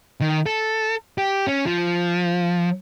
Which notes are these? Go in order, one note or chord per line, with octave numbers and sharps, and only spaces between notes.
D#3
A4
G4
C#4
F3